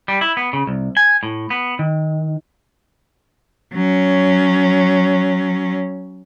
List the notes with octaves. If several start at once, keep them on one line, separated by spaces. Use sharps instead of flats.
G3
E4
B3
C#3
C2
G#5
A2
B3
D#3
F#3 C#4